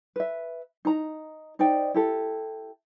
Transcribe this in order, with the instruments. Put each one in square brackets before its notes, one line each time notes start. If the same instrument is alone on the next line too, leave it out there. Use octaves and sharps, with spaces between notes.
[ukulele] B4 E5
D#4 A#5
D#4 C5 D5 G5
E4 G4 A4